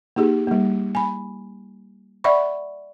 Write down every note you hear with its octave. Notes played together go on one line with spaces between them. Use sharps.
A#3 D#4 G4 G#4
G3 A#3
G#5 B5
D5 E5 F#5 B5 C#6